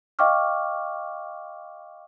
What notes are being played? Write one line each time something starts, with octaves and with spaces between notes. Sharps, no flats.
D#5 F5 G5 C#6 D6 F6